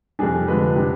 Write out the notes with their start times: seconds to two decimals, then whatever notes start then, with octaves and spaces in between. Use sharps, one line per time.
0.19 F2 C3 G3 D4 G#4
0.48 D3 F3 G#3 B4
0.76 C3 G3 D4